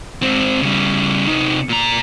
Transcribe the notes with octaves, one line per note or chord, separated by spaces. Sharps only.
G#2 C4
C#3 G3
C3 D#4
A#2 A#5